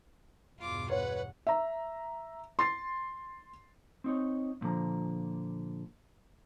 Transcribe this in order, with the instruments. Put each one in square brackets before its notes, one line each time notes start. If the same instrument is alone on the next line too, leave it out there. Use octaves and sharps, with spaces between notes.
[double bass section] E2 G2 B2 [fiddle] F4 D6
[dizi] B4 [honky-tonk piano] C#5 [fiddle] F#5
[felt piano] E5 A#5
C6 A6 C7
[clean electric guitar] C4 D#4 C#5
F#2 A#2 D3 F3 A#5